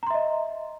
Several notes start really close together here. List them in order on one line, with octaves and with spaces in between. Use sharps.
A#5 C6 E5 D#5